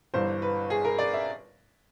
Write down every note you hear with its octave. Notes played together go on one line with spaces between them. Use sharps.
G1 G2 E3 C5
B4
G#4
A#4
D5
E5